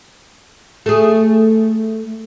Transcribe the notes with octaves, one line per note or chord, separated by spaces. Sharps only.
A3 G#4